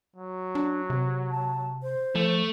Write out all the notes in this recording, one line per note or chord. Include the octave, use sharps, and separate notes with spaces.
F#3
D4
C3
A5
C5
F3 A3